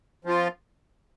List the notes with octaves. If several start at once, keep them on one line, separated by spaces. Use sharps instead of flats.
F3 C4 F4